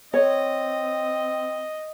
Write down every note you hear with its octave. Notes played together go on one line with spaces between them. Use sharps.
C4 C#5 D#5